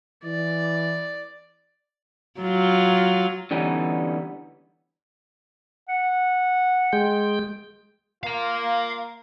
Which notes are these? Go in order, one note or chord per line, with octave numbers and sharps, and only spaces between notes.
E3 D5
F#3 F4
D3 E3 G3 B3 C#4 D#4
F#5
G#3 G5
A#3 F4 F5 A#5